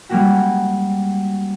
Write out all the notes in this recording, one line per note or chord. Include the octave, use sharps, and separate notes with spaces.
G3 G#3 A#3 C#4 F#4 G4